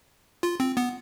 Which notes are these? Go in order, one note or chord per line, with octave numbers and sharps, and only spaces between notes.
F4
C4
B3